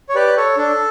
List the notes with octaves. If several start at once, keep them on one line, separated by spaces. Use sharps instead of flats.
C#5
G4 B4 D5
A4 C#5
D4 A4